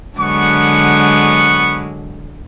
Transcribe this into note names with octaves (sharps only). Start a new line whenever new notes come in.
D3 F#3 G#3 B3 F#5 C#6